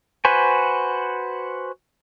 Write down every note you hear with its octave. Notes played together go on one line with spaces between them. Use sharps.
F#4 B4 C5 G#5